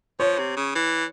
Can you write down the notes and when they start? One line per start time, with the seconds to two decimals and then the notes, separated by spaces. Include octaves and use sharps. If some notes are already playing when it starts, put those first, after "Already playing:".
0.20 F3 C#5
0.38 C3
0.57 C#3
0.75 E3